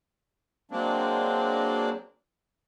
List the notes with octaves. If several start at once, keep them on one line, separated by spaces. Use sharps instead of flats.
F#3 G#3 A#3 C4 D4